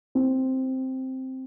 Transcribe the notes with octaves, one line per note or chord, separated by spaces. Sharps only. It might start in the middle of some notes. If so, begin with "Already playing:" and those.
C4